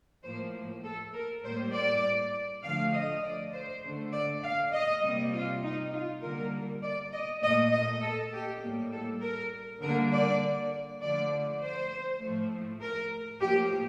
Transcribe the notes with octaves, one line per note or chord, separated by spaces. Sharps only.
A2 F3 A#3 C5
A4
A#4
A2 G3 A#3 C5
D5
D3 F3 A3 F5
D#5
D5
C5
D3 A3
D5
F5
D#5
C3 G3 A#3
F4
D#4
F4
D3 G3 A#3 A#4
D5
D#5
A#2 A3 D#5
D#5
A4
G4
A2 G3 A#3
A4
A#4
D3 G3 A#3 A#4
D5
D3 F3 A3 D5
C5
A2 F3 A3
A#4
A2 F3 A#3 G4